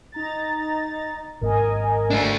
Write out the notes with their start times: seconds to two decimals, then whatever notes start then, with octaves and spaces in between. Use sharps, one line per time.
0.12 D#4 A#5 A6
1.41 G#1 G#2 A#3 A#4 D#5 G#5
2.10 A3 D4